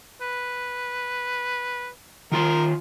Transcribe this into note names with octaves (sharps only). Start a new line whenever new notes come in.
B4
D#3 F4 A#4 C6